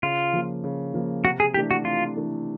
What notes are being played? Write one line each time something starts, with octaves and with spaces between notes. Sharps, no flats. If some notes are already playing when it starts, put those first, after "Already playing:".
C#3 F4
F3 A#3
C#3
F3 A#3
C3 F#4
G#4
E3 A3 D4 G4
F#4
C3 F4
E3 A3 D4